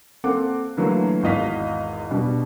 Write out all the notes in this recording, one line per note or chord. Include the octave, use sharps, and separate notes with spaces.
A#3 C4 A4 F#5 D6
D3 E3 F#3 A3 A#3
G#1 E2 D#5 F5 B6
B2 G3 D4